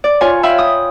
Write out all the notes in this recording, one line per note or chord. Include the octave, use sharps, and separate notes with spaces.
D5
F4 C#5 G#5
E5 F5 G5 G#5 B5 E6
D#6